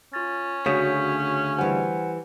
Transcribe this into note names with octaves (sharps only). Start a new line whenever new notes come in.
C#4 F4 A6
D2 C#3 F#4 C#5 D#6 G6 B6
E3 G3 C5 F#5 G#5